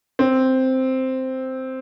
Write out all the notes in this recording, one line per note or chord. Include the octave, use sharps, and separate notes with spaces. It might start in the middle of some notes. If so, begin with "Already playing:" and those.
C4